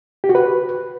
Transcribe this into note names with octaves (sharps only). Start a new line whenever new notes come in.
G4
F#4
B4